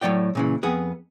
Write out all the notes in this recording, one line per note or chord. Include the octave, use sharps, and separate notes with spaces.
A2 F#3 C#5 D5 G5
A#2 C#3 E3
F2 B3 G#4